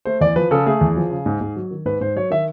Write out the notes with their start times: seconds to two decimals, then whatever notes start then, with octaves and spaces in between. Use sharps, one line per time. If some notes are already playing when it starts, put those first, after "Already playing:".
0.05 A3 C5
0.21 E2 D5
0.36 F3 B4
0.51 C#3 A4
0.66 A3 G#4
0.81 E2
0.96 F3
1.11 C#3
1.26 G#2
1.41 G#2
1.56 F#3
1.71 D#3
1.85 G#2 B4
2.01 G#2 C5
2.16 F#3 C#5
2.30 D#3 E5